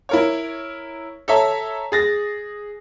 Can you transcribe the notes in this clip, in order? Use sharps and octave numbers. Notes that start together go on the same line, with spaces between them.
E4 A#4 C#5
A4 C#5 E5 A#5
G#4 A6 A#6